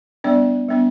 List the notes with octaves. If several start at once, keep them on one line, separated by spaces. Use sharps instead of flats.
G3 B3 D4 D5
G3 B3 D4